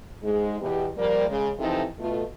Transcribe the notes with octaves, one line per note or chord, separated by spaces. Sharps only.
G#2 G#3
E2 B2 G4
F3 G3 A#3
C#3 G#3
C3 E3 F3 D#4 A4
B2 A3 F4